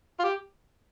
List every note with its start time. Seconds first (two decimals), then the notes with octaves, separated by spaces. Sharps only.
0.20 F4
0.24 G4